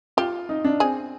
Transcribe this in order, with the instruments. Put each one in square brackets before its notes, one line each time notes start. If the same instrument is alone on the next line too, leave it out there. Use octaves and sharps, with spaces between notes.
[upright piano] F4 [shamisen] G4
[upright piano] D#4
D4
[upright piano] C4 [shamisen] G#4